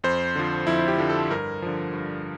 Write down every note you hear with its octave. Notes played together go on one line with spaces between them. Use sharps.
F2 C5
D3 F3
F2 E4
G4
D3 F3
A4
G2 A#4
D3 F3
G2